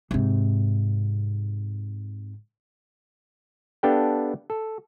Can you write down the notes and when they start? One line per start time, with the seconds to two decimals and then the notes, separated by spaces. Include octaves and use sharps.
0.11 G#2 C3
3.83 B3 D4 G4 A4 F5 G5
4.50 A4